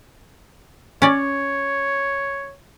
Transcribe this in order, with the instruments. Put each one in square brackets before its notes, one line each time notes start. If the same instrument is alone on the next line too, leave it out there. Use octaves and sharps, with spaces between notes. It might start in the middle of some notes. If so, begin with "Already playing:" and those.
[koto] C#4 D5 [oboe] C#5